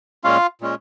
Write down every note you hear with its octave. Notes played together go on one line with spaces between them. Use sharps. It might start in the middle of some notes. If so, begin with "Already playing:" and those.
A#2 G#3 C#4 F4 F5
A#2 G#3 C#4